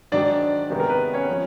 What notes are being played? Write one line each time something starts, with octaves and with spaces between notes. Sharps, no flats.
G#2 D#3 F#3 D4 D5
C3 D#3 G#3 B3
A#4
B4
C#4 C#5
F3